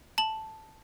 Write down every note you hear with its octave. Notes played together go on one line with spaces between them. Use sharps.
A5 F#7